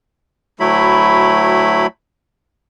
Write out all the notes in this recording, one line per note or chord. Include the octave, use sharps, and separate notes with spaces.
D2 F#3 A3 E4 B5